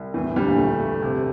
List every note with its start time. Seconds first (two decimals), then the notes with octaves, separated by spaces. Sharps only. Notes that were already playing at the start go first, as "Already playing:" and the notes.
Already playing: C2
0.14 E2 A2 E3
0.25 E2 E3
0.36 D2 D3 G3
0.47 A#1 A#2
0.58 A3
0.80 A3
1.02 C3